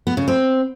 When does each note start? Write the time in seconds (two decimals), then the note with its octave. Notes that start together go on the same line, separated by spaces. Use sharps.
0.07 B3
0.17 C#3
0.28 C4